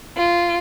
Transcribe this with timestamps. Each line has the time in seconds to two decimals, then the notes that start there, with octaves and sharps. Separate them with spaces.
0.16 F4